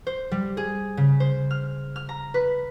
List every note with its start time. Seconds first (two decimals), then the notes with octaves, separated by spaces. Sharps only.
0.07 C5
0.31 G3
0.57 G#4
0.97 C#3
1.20 C5
1.51 F6
1.96 F6
2.09 A#5
2.34 B4